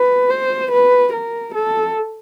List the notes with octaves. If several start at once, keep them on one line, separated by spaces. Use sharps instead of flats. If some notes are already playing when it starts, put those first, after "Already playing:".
Already playing: B4
C5
B4
A#4
A4